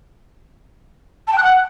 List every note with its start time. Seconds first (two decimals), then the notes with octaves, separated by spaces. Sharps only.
1.28 A5
1.33 G5
1.38 F#6
1.43 F#5